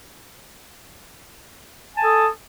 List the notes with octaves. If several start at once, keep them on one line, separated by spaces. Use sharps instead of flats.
A4 G#5 A5 D#6